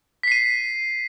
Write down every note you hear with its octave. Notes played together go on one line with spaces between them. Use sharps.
B6 C7 D#7